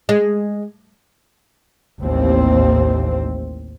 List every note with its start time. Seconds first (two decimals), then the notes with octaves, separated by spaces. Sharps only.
0.09 G#3
2.00 A1 D#2 C4